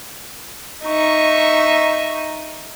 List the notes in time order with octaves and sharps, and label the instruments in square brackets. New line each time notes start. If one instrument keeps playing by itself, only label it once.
[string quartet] D#4 E5 C#6